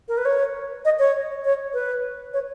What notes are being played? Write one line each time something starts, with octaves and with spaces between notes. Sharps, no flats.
A#4
B4
C#5
D#5
C#5
C#5
B4
C#5